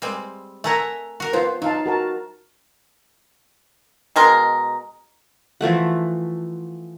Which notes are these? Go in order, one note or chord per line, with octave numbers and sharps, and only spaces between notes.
G3 G#3 C4
A3 A#4 E5 F#5 G#5 A#5
F#4 A#4
F3 B3 F4 C5
F#3 D#4 F5 A5
F#4 A#4 A5
B2 G#3 A#4 C6
E3 F3 A3 F#5